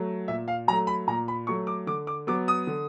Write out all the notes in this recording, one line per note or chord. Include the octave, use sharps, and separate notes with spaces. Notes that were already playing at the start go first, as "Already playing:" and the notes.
Already playing: F#3 A3
A#2 E5
F5
F#3 A3 A#5
B5
A#2 A#5
B5
F#3 A3 C#6
D6
D3 D6
D6
F#3 B3 D6
D#6
D3